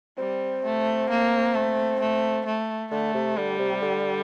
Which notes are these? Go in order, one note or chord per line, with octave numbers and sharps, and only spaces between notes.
G3 C4
A3
A#3
A3
A3
A3
D3 A3
C3
D3 G3
C3
D3